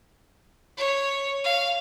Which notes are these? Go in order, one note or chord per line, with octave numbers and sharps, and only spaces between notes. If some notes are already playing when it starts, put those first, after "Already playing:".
C#5
F5